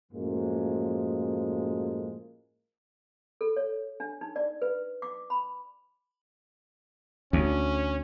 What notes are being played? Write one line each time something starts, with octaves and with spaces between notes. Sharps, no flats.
F#2 A2 F3 G#3 A#3
A4
C#5
D4
D#4
D5
B4
D6
B5
D2 C#4